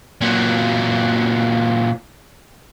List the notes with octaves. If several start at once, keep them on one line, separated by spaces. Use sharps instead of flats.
A#2 F#3